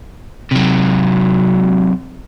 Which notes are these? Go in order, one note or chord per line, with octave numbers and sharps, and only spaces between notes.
C3 F#3